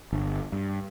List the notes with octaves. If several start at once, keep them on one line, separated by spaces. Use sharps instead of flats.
G1
G2